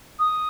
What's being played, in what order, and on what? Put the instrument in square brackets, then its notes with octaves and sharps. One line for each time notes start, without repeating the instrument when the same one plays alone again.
[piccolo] D#6